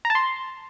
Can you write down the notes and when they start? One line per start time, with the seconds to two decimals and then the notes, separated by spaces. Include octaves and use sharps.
0.05 A#5
0.10 A5
0.15 C6